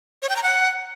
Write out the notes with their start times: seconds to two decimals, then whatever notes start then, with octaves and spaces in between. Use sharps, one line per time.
0.22 C#5
0.29 G5
0.36 A#5
0.43 F#5